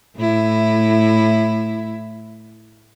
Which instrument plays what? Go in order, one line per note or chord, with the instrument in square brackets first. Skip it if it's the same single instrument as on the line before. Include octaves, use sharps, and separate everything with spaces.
[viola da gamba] A2 E4